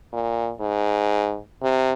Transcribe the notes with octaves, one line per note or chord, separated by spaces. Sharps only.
A#2
G#2
C3